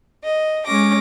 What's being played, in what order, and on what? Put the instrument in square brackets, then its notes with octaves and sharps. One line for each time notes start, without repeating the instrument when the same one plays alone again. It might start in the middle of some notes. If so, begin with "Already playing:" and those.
[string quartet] D#5
G#3 C#4 D6 A#6